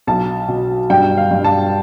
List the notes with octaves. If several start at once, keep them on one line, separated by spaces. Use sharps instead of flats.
B1 A5
B2
G2 G5
F5
G2
A5